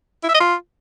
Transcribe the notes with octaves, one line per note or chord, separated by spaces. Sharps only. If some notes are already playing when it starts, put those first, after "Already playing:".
E4
E5
D#5
F4